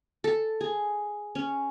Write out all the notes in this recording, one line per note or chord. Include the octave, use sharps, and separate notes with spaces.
A4
G#4
C#4